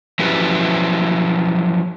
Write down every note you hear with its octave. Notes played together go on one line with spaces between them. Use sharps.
F3 F#3 C#4 E4 G4 B4